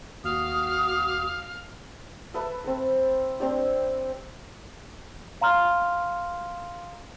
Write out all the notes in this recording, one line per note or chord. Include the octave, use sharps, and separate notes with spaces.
D#2 F#4 F5 D#6
A4 B4 E5 A5
C4 A4
C4 D4 G4
F5 A#5 C6 F6